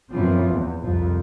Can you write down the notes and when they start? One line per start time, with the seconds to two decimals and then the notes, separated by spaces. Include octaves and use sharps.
0.12 F#2 E3 F3 B3 C4
0.51 E2
0.83 C2 F2 F3